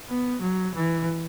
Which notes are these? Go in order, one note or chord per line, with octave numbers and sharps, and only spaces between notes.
B3
F#3
E3